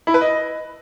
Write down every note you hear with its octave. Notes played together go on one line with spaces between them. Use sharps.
E4
B4
D#5